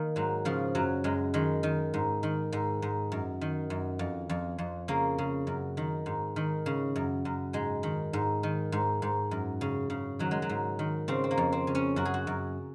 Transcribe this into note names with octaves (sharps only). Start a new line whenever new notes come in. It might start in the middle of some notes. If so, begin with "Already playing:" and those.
Already playing: D#3 A#3
G#2 F#3
C#3 F3
F#2 F#3
F#2 G#3
D#3 G#3
D#3
G#2
D#3
G#2
G#2
F#2
D#3
F#2
F2
F2
F2
C#3 A#3
C#3
F#2
D#3
G#2
D#3
C#3
F#2
F#2
G#2 G#3
D#3
G#2
D#3
G#2
G#2
F#2
C#3
C#3
D#3 F#3
G#3
F#3
G#2
D#3
C#3 C4
C4
A#3
F2
C4
C#3
C#4
F#2 F#4
G#4
F#4
F#2